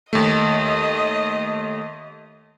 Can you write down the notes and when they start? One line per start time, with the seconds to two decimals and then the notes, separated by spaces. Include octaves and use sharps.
0.13 D#2 A3 D#5